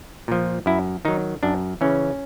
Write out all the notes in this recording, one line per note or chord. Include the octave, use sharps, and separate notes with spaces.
A#2 F3
F#2 E4
D#3 F#3 D#4
F#2 D4
C#3 E3 C#4